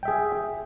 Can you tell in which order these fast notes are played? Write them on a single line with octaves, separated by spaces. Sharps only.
G5 E5 G#4